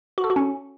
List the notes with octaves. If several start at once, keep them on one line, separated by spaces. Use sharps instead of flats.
F#4
A4
F#4
C#4